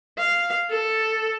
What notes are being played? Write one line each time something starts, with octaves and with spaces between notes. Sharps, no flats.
F5
A4